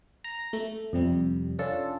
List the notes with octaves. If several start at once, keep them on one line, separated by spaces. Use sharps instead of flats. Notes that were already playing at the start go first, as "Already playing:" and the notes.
A#5
A3
F2 C3 G3
C#4 D4 F4 A4